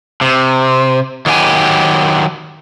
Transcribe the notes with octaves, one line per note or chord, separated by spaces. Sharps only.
C3
D#3 F#3 G4 E5 G#5